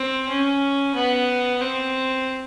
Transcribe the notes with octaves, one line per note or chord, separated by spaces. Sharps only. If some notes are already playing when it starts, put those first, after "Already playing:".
Already playing: C4
C#4
B3
C4